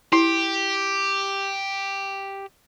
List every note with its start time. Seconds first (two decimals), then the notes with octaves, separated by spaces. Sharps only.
0.13 E4 G4